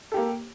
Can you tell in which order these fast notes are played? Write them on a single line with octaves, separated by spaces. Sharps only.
A4 G4 A#3